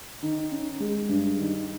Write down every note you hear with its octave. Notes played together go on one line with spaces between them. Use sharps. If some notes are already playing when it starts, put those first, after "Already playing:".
D#3
C#4
G#3
G2
D#3